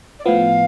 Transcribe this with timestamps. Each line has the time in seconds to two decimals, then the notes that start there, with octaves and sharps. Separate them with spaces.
0.19 D5
0.25 A2 F3 B3 F5